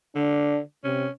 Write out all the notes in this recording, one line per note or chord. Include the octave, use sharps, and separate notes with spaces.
D3 D4
C3 C#4